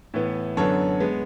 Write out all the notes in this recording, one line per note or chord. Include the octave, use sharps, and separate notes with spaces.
A2 E3 B3
F#2 D3 F#3 B3 A4 C#5
G#3 B3